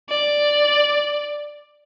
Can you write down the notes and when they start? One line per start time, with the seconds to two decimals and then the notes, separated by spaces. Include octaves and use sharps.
0.09 D5